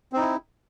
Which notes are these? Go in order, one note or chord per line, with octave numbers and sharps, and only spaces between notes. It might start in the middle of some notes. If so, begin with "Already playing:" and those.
C4 D#4 E4